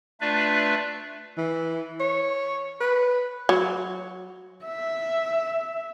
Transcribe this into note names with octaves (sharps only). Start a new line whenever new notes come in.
A3 D4 F4 B4 D5 E5
E3
C#5
B4
F#3
E5